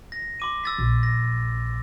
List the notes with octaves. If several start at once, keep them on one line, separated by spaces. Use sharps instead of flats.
A#6
C6 D6 D#7
E6 A6 B6
A#1
A#6